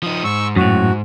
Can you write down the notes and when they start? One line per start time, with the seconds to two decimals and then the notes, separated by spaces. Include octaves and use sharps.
0.03 F3 D#4 D#6
0.24 G#2 C#6 E6
0.56 F#2 A2 F#4